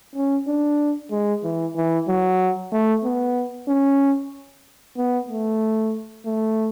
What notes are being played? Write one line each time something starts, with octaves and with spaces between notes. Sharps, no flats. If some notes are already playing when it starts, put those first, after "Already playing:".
C#4
D4
G#3
E3
E3
F#3
A3
B3
C#4
B3
A3
A3